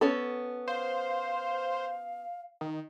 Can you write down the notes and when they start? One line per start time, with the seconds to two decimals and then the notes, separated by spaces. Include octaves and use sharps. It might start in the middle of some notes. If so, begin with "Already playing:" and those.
0.01 B3 C#4 A4
0.68 C5 F5
2.61 D#3